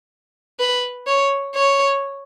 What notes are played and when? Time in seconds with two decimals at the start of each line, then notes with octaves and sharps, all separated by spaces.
0.59 B4
1.07 C#5
1.55 C#5